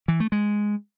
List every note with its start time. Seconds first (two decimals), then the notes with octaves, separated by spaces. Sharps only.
0.08 E3
0.20 A3
0.32 G#3